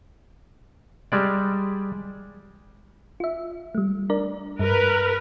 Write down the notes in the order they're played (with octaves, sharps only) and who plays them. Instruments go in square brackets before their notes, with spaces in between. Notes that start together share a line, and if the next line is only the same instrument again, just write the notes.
[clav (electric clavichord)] G3 G#3 D5
[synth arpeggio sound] F4 E5
G3 A3
D4 A#4 D5
[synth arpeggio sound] G2 [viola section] A#4 B4